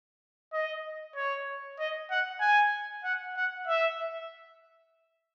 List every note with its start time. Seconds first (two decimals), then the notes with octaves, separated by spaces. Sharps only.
0.53 D#5
1.16 C#5
1.79 D#5
2.10 F#5
2.41 G#5
3.04 F#5
3.37 F#5
3.68 E5